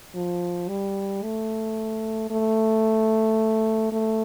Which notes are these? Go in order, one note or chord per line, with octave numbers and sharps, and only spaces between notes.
F3
G3
A3
A3
A3